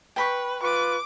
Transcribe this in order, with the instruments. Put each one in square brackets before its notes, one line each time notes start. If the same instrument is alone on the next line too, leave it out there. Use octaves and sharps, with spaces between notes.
[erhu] B4 [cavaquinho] G5 B5 C#6
[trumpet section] F4 B4 [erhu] D6